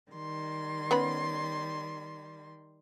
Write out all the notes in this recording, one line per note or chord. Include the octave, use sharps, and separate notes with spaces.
D#3 G3 C6
B3 C#4 B5